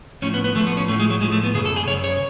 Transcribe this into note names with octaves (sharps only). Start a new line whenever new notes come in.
A2 F3 C#4
B3
B3
A2 F3 A3
B3
C#4
A2 F3 A3
G#3
F#3
A2 F3 G#3
A3
B3
F#2 C#3 G#4
A4
G#4
F#2 C#3 C#5
C#5